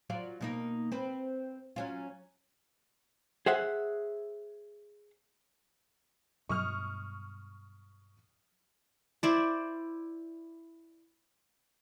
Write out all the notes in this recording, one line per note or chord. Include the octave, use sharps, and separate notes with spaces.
F#3 F4 D5
B2 A#3 D#4
C4 B4
F#3 C#4 F4
G#4 C5 E5 F#5
G2 B2 F#3 C#6 D#6 F6
E4 C5 D5